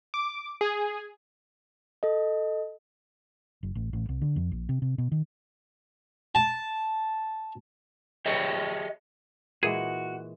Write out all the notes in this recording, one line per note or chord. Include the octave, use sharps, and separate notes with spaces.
D6
G#4
A4 D#5
F#1
A1
A1
C2
D3
F2
A#1
C3
C3
B2
D#3
A5
G4 G#4 C#5 D#5 E5
A#2 E3 G#3 F#4 G#4